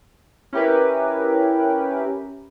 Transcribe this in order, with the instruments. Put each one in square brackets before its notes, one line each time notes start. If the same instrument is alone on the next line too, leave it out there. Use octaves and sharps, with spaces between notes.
[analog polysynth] C#4 E4 G4 A#4 B4